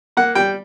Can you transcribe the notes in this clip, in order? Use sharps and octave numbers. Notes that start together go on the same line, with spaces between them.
A#3 F#5
G3 G5